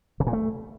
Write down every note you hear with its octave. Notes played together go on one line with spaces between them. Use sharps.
C#3
A#2
A3